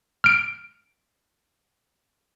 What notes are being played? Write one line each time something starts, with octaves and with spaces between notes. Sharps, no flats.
F6 D7